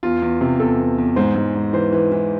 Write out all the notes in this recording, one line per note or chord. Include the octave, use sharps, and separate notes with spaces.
E2 F4
E2
C3
E2 A4
E2
E2
G#2 C5
G#2
G#2
E3 C5
E3
E3